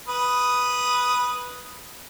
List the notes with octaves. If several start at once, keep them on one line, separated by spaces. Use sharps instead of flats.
B4 D#6